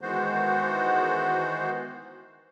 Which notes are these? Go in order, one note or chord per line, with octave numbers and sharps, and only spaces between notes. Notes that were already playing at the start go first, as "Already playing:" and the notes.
D#3 E3 G#3 B3 F#4 C5